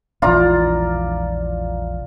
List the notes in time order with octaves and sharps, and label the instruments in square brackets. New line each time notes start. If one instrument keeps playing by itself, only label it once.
[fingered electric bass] E1 A#1 E3 [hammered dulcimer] F4 D5 A#5